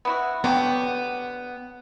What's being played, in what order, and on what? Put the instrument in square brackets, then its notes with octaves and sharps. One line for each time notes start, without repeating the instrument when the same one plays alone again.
[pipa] B3 E4 F#4
[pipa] D3 F#3 G4 [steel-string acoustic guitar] B3